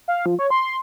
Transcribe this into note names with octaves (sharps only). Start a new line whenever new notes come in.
F5
F3
C#5
C6